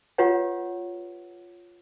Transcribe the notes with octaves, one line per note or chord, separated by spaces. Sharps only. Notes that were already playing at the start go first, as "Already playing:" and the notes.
F4 G4 B4 C#5 F#5